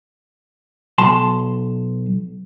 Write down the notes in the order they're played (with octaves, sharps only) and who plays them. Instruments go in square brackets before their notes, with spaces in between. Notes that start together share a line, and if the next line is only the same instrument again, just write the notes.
[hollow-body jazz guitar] B1 A5 C6